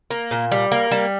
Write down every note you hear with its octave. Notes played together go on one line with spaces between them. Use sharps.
A#3
A#2
G3
A#3
G3